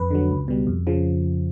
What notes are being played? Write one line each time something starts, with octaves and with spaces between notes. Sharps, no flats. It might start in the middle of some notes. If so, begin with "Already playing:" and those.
Already playing: F2 B4
D3 F#3
C#2
B2 G3
F2
C#3 F3